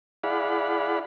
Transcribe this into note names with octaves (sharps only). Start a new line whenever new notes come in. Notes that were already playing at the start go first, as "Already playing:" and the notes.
E4 G#4 D5 F5 F#5 B5